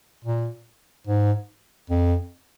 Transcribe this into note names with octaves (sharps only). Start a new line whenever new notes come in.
A#2
G#2
F2